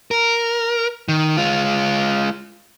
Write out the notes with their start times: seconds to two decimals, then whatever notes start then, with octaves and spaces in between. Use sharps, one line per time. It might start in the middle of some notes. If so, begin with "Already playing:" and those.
0.11 A#4
1.09 D#3
1.37 G#3 F4